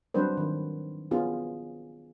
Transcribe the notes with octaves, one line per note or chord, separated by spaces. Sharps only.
F#3 G3 C4 D4 B4 C5
D#3 F#3
B3 C#4 F4 G#4